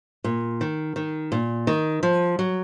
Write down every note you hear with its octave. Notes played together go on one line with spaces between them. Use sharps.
A#2
D#3
D#3
A#2
D#3
F3
F#3